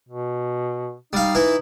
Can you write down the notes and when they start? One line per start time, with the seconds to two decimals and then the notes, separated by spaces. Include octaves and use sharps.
0.09 B2
1.13 G3 D#4 F5
1.35 E3 E4